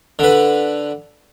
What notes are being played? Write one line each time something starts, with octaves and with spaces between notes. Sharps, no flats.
D3 B4